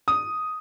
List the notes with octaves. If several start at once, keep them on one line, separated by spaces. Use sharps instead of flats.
D#6